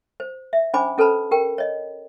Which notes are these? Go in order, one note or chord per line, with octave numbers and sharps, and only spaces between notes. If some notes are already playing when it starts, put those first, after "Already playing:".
C5
E5
C#4 D4 C5 G#5 B5 D6
C#4 A4 B4 C5 A5 B5
G4 A#4 G5
C#5 D#5